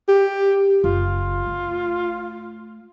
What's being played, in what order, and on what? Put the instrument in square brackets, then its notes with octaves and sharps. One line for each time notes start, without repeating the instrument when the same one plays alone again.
[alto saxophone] G4
[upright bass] F#1 [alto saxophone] F4
[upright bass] A3